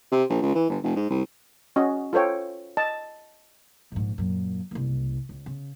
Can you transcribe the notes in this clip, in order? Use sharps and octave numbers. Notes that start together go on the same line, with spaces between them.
C3
A#1
C#2
E3
G1
F1
G#2
C2
C#4 F#4 D#5
F4 A4 C5 C#5 G5
D#5 A5
A#1 G#2
F#2 A#2
F#1 C2
C#2
C#3